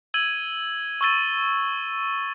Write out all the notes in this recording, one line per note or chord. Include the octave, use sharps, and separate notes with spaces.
E6 G#6 D#7 F#7
C#6 E6 A6 D#7